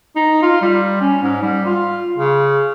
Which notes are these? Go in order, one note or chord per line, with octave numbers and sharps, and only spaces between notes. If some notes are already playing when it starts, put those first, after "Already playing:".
D#4
F4
G3
C#4
G#2
G3
F4
C#3